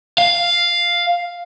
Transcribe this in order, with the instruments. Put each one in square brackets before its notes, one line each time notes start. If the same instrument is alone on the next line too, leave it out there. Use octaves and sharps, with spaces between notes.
[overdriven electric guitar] F5